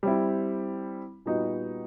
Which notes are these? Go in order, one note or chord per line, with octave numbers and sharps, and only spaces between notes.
G3 C4 E4
A#2 G3 B3 D#4 F#4